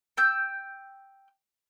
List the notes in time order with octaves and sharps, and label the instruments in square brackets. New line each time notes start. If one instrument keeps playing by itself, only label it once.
[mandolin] G5 E6 G6